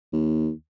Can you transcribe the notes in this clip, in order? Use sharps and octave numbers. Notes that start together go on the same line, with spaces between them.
D#2